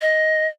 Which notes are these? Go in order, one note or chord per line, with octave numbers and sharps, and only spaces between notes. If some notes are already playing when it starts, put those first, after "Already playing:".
D#5